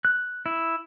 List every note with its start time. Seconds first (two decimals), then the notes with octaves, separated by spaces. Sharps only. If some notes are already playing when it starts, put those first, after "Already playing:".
0.05 F#6
0.46 E4